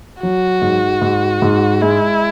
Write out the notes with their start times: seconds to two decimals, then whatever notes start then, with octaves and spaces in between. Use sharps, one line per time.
0.23 F#3 F#4
0.62 G#2
1.02 G#2
1.42 G#2
1.82 G#3 E4